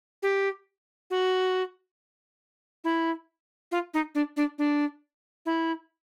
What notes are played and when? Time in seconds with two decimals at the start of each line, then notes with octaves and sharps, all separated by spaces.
0.23 G4
1.10 F#4
2.84 E4
3.72 F4
3.94 D#4
4.15 D4
4.37 D4
4.58 D4
5.46 E4